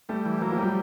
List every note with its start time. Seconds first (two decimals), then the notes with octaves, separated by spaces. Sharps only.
0.09 G3 A3
0.26 E3
0.42 F#3 A#3
0.52 F3
0.58 F#3 G3